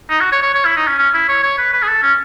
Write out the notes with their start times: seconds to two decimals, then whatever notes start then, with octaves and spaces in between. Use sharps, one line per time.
0.09 D#4
0.20 F#4
0.32 C#5
0.42 C#5
0.54 C#5
0.65 E4
0.77 D#4
0.87 C#4
0.99 C#4
1.14 E4
1.29 C#5
1.43 C#5
1.58 B4
1.73 B4
1.83 G#4
1.88 A4
2.02 C#4